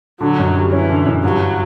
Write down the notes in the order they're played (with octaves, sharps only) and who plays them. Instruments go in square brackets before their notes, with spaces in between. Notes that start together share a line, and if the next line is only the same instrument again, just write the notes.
[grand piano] D3 [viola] F#3
[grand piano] F#2
G3
[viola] E3 [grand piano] C#4
[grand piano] D3
F#2
[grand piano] G2 [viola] F#3